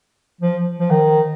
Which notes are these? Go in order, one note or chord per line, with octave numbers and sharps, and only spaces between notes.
F3
F3
D#3